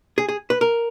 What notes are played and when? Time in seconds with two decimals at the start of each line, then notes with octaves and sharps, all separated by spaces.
0.18 G#4
0.28 G#4
0.50 B4
0.61 A#4